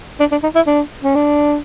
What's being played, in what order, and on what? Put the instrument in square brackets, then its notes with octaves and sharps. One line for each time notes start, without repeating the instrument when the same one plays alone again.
[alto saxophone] D4
D4
D#4
E4
D4
C#4
D4